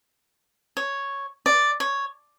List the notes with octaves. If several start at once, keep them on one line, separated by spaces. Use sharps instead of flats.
C#5
D5
C#5